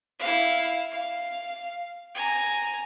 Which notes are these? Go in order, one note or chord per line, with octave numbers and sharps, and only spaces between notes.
E4 F5
F5
G#5 A#5